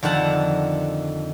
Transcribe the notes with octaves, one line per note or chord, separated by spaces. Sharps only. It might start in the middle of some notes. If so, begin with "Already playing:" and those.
F2 D3 D#3 F#5 A5